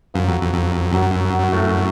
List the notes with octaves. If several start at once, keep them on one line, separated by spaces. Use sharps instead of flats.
F#2 F3
F2 F#3
F2
F2
F#2 F#3
F#3
A2 A3